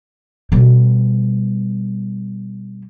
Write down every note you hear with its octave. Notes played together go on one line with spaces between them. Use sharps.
B2 G3